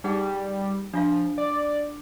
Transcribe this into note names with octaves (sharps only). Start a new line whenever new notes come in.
G3 D#4 G#4 F#5
F3 D4 F4 F5
D5